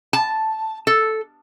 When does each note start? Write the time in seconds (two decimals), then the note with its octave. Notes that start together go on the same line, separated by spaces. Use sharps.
0.13 A5
0.87 A4